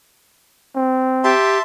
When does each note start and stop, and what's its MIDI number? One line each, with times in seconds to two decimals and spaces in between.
0.76 1.34 60
1.24 1.58 67
1.24 1.62 76
1.24 1.62 81
1.24 1.62 84